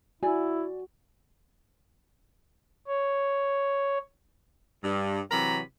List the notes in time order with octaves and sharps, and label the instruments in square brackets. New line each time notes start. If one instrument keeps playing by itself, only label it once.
[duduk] E4 [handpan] F#4 [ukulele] D5 G#5
[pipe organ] C#5
[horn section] G2
C3 E3 F#3 A#5 B5